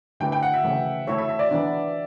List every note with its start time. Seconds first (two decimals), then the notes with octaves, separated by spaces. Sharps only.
0.20 D3 A3 E4 G4 B4 G5
0.32 G5
0.42 F#5
0.54 E5
0.64 C#3 E3 A3
1.07 A3 E4 A4 C#5 E5
1.18 E5
1.29 E5
1.39 D5
1.51 E3 B3 D4